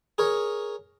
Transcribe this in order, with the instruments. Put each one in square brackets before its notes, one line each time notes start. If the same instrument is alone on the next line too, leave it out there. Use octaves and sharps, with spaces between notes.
[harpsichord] G#4 A#4 C#5